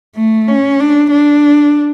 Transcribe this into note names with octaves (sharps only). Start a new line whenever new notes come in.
A3
C#4
D4
D4